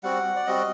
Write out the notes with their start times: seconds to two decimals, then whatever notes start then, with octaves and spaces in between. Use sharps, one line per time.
0.03 G3 C4 F#4 F#5
0.36 D5
0.46 G3 C4 F#4 D#5